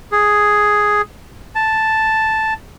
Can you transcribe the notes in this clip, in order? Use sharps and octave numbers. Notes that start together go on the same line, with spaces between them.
G#4
A5